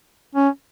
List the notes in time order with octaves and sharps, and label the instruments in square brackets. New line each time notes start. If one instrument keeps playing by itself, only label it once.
[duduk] C#4